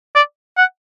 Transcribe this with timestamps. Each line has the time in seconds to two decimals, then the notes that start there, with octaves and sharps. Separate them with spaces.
0.15 D5
0.58 F#5